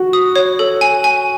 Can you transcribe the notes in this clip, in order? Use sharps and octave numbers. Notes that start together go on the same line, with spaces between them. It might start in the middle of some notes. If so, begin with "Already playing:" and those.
Already playing: F#4
D#6
C#5
A4
G#5
G#5